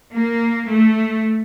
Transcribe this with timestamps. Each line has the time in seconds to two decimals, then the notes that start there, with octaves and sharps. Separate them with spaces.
0.14 A#3
0.70 A3